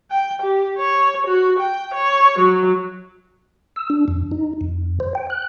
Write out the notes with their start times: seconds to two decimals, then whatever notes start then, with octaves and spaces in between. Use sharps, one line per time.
0.11 G5
0.42 G4
0.78 C#5
1.27 F#4
1.59 G5
1.94 C#5
2.39 F#3
3.76 E6
3.90 D4
4.08 F2
4.31 D#4
4.61 F2
5.00 C5
5.15 G5
5.30 F#6